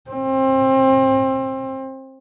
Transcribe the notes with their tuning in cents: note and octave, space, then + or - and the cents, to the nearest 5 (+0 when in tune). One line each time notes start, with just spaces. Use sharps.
C4 +25